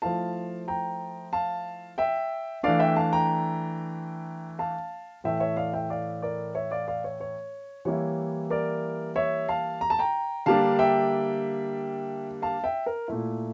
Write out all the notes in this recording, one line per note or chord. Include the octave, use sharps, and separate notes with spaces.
F3 A3 E4 F5 A5
G5 A#5
F5 A5
E5 G5
E3 A3 D4 D5 F5
E5 G5
F5 A5
G5 A#5
F5 A5
A2 E3 A3 E5 G5
C#5 E5
D5 F5
E5 G5
D5 F5
A#4 D5
C#5 E5
D5 F5
D5 F5
C#5
C#5
E3 G3 A#3 E4 C#5
A#4 D5
C#5 E5
F5 A5
A#5
A5
G5 A#5
D3 G3 A#3 D4 F5 A5
E5 G5
F5 A5
E5 G5
A#4
A#2 A3 E4